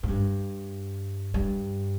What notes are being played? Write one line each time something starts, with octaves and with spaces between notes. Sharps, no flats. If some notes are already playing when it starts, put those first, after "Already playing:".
G#2
G2
G2